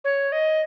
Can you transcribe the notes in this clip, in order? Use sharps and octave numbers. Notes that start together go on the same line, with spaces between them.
C#5
D#5